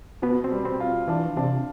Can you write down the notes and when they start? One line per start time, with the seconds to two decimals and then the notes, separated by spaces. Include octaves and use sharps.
0.22 B2 B3
0.44 C4
0.52 G3
0.65 C4
0.80 F4
1.08 E3 D4
1.37 C3 D4